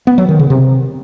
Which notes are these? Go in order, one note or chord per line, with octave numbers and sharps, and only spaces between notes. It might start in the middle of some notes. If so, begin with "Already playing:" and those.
B3
F#3
D#3
C#3
C3